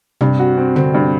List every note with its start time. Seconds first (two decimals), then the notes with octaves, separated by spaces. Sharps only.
0.21 G2 C3
0.39 F#4
0.57 C4
0.76 D3 C4
0.94 G2